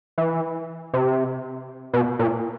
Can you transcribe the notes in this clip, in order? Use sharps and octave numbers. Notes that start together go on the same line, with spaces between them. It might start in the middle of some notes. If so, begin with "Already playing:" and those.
E3
C3
B2
A#2